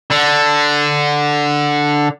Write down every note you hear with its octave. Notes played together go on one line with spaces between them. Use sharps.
D3